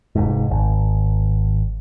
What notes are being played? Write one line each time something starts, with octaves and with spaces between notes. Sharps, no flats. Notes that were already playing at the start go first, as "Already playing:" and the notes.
F1 G#2
G#1